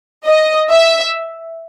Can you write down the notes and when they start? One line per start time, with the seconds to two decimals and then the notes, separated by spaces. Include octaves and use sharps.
0.24 D#5
0.69 E5